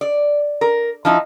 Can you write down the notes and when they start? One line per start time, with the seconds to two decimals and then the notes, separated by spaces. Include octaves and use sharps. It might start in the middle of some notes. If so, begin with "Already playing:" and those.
0.01 D5
0.61 A#4
1.05 F3 D#4 E4